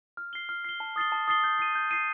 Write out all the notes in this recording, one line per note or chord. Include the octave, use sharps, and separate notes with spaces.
F6
C7 G7
F6
C7 G7
A5
D#6 A6 C7 G7
A5
D#6 A6 C7 G7
G6
C7 D#7
G6
C7 D#7